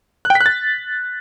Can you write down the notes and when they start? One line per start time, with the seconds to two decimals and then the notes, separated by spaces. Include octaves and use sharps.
0.25 F#6
0.30 G5
0.35 B6
0.41 F#6
0.46 A6